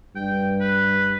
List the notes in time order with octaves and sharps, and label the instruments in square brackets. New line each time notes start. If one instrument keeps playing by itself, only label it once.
[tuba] G2 [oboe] G5
[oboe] B4